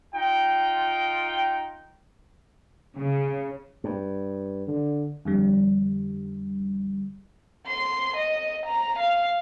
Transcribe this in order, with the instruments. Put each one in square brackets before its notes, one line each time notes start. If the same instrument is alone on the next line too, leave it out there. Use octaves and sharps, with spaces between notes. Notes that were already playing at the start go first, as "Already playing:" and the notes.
[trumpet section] D#4 F4 G5
[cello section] C#3
[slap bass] G2
[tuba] D3
[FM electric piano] F2 D3 G3
[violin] C6
D#5
A#5
F5